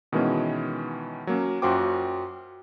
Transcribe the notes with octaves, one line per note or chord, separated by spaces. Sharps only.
B2 D#3 E3 G#3 B3 C#4
F#3 A#3 C#4
F#2 F4 F#4 C5 G5 D6